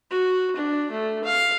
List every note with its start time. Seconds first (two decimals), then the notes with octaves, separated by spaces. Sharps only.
0.11 F#4
0.56 D4
0.91 A3
1.24 F5